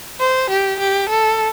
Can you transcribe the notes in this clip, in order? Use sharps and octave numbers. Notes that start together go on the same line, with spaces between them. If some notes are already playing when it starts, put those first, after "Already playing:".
C5
G4
G4
A4